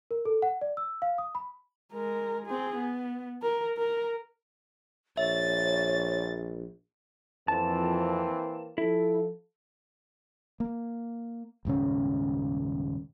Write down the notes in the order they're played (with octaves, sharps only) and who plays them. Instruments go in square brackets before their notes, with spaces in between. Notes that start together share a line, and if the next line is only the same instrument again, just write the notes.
[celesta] A#4
A4
F#5
D5
E6
F5
D#6
B5
[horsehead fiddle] G#3 A#4
C4 G#4
B3
A#4
A#4
[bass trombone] A#1 [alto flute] C#5 [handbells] E5 [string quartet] A6
[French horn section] F2 [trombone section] E3 A#3 C4 [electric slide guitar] A5
[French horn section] F3 A4 [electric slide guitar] E4
[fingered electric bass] A#3
D#1 G#2 C#3 C#4